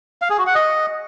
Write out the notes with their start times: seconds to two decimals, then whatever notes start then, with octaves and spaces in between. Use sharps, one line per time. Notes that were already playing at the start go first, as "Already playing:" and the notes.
0.22 F5
0.30 G#4
0.38 F#4
0.47 F#5
0.55 D#5